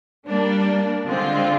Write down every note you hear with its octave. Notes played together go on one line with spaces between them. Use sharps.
G3 A#3 D4
D3 G#3 C4 F4